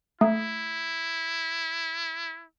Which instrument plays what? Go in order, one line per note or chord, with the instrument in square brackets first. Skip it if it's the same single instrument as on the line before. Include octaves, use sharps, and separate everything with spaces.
[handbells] A3 [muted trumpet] E4